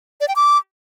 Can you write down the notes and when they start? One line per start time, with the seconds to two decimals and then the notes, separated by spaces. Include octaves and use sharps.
0.21 D5
0.28 G5
0.36 D6